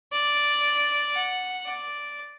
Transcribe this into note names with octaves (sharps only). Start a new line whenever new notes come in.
D5
F#5
D5